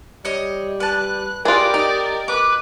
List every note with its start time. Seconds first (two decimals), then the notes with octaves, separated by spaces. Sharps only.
0.25 G3 C#5 D#5
0.80 B4 A5 F#6
1.45 F4 G4 G#4 A#4 B4 D5
1.74 D#4 D#5
2.28 B4 D6